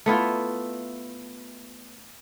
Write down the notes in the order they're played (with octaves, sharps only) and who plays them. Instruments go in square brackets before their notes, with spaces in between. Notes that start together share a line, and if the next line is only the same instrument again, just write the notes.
[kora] A3 B3 E4 F4